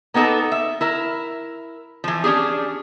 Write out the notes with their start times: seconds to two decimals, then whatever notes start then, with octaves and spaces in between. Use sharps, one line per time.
0.14 A#3 B3 D#4 G4 A4
0.52 E5
0.81 E4 A#4 E5
2.04 E3 F3
2.24 C#4 D4 G4 G#4